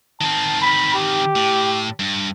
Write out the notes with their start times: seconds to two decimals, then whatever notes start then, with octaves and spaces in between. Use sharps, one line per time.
0.21 D#3 C4 A5
0.62 B5
0.95 G4
1.36 A2
1.99 G2